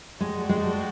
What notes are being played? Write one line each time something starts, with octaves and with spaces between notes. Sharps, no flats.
G#3 F#4 A4 D5 G5
G#3